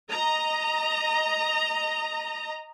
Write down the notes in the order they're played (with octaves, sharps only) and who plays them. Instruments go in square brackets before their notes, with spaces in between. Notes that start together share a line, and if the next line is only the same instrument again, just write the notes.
[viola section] D#5 A#5